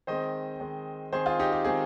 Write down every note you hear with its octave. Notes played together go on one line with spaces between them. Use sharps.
D#3 G#3 C4 C5 D#5
D#3 G#3 C4
D#3 G#3 C4 G#4 C5
F4 G#4
D#4 G4
G4
D#3 G#3 C4 G#4